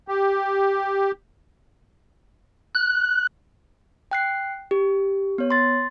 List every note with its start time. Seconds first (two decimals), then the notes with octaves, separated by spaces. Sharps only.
0.08 G4
2.75 F#6
4.11 G5 F#6 C7
4.71 G4
5.38 B3 C#5
5.51 C6 A6